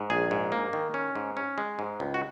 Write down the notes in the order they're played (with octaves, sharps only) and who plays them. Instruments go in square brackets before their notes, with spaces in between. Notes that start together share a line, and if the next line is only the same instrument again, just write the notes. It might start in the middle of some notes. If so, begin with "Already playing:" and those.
Already playing: [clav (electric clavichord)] G#2
A#1 G#4
G#2
A#3
D#3
C#4
G#2
C#4
G#3
G#2
C#2
F#4